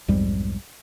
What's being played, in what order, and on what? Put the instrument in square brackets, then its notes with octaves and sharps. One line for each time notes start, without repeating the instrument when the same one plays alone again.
[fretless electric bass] B1 F2 G#2 G3